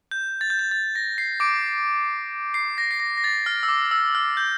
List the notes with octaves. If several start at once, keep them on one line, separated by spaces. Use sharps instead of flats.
G6
A6
G6
A6
A6
A#6
C7
D6 D7
C7
A#6
C7
A#6
A#6
A6
F6
E6
D6
E6
F6
G6